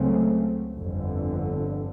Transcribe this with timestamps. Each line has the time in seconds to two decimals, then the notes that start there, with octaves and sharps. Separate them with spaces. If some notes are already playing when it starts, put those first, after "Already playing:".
Already playing: C#2 C#3 F#3 A3 C4
0.78 G1 F2 D3